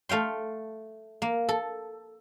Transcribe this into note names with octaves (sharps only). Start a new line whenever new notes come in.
A3 F5 G5 C6
A#3
A4